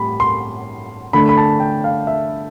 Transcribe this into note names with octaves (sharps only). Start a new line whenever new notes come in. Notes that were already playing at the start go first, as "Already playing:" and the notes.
Already playing: A2 G3 B5
C6
D3 A3 D4 B5
B5
A5
G5
F5
E5